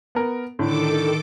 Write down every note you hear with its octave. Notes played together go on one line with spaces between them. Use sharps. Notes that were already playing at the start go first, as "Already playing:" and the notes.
B3 A#4
A2 D3 D#3 A4 D6